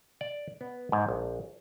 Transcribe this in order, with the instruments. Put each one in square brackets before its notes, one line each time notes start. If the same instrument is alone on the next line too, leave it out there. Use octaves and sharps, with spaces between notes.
[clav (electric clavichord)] D5
B3
G#2
A#1